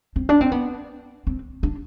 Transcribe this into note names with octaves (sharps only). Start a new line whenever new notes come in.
C4
D4
C4
B3
C4
D4